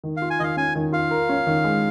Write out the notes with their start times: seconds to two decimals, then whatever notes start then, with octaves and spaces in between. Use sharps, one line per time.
0.04 D#3
0.17 F4 F5
0.30 G#5
0.40 D#3 D#5 F5
0.57 C#4 G#5
0.75 D#3
0.92 F4 F5
1.11 A#4
1.29 C#4
1.47 D#3
1.64 G#3